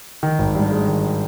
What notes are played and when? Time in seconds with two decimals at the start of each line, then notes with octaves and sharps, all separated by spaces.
0.23 D#3
0.39 G#1
0.55 G2
0.71 G#3
0.88 D#3